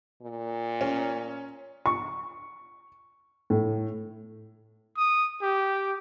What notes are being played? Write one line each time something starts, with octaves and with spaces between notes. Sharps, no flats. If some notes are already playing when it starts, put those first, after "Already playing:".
A#2
C#4
C#6
A2
D#6
G4